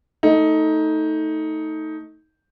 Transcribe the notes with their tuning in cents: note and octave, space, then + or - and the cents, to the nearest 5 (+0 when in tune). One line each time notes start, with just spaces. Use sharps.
A3 +10 D#4 +15